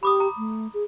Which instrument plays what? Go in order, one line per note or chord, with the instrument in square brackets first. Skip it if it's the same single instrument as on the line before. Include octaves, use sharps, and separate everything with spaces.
[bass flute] G4 [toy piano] B5 D6 D#6
[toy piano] A#5
[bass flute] A3
G#4